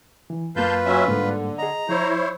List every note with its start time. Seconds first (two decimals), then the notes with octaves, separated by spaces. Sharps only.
0.30 E3
0.56 F#2 A#3 F4 B4 F5 A5 G6
0.85 F#3 C#4 E5
1.08 G#2 D3 G3 A#3
1.59 G#4 D#5 A#5
1.89 F3 E4 C5 C#5